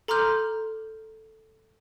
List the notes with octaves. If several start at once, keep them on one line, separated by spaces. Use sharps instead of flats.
A4 A#5 C6 D6 F6 G6